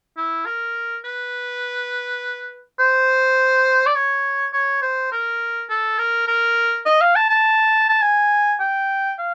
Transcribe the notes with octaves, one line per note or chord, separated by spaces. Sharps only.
E4
A#4
B4
C5
D5
C#5
C#5
C5
A#4
A4
A#4
A#4
D#5
F5
A5
A5
A5
G#5
G5
F5